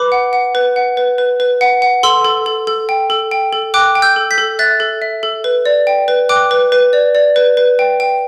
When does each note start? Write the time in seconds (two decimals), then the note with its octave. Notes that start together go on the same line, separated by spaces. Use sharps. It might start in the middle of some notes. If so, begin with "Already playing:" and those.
Already playing: B4 B5 D6
0.12 F#5
0.33 F#5
0.55 B4
0.76 F#5
0.97 B4
1.18 B4
1.40 B4
1.61 F#5
1.82 F#5
2.03 A4 C6 E6
2.25 A4
2.46 A4
2.67 A4
2.89 G5
3.10 A4
3.31 G5
3.53 A4
3.74 G5 D6 F#6
3.95 G5
4.02 E6 G6
4.16 A4
4.31 G6 B6
4.38 A4
4.59 E5 F#6 A6
4.80 A4
5.02 E5
5.23 A4
5.44 B4
5.66 D5
5.87 G5
6.08 B4
6.29 G5 D6 F#6
6.51 B4
6.72 B4
6.93 D5
7.15 D5
7.36 B4
7.57 B4
7.79 G5
8.00 G5